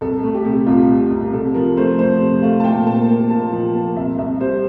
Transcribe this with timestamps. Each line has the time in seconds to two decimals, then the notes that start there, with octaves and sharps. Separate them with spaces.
0.01 C2 A4
0.23 A3
0.34 G4
0.45 C3
0.66 C2 F4
0.89 C3
1.11 C2
1.33 C3 A4
1.54 F3 A#4
1.77 A3 C5
1.99 F2 C5
2.20 C3
2.42 A3 F5
2.60 A5
2.64 A#2 G5
2.86 A#3 A5
3.08 A#3
3.30 A#2 A5
3.53 F3
3.75 A#3
3.96 C2 E5
4.18 C2 E5
4.40 G3 C5